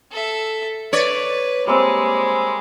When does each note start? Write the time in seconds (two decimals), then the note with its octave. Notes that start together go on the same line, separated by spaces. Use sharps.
0.12 A4 E5
0.93 B4 C#5 D5
1.67 G3 G#3 A#3 C4